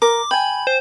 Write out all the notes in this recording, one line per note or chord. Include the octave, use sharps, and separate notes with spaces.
A#4 D6
G5 G#5 B5
C5